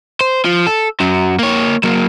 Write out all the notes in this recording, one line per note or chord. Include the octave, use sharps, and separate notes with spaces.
C5
F3
A4
F#2 F#3
A#3 C#5
F#3 A#3